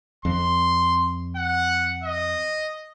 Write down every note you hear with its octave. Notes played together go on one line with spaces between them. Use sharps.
F2 C6
F#5
D#5